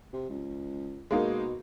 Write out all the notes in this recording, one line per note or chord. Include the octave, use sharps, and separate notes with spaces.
C3
C#2
B2 G#3 A#3 D#4